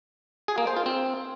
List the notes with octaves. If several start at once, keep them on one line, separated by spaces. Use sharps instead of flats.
G#4
A#3
C5
F4
C4